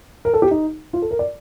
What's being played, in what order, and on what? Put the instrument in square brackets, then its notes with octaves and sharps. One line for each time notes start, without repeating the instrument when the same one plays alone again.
[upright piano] A#4
A4
G4
D#4
F4
A4
A#4
D5